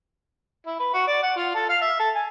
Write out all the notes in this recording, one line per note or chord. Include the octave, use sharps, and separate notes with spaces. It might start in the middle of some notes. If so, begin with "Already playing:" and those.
E4
B4
F#4
D5
F#5
F4
A4
F5
E5
A4
G#5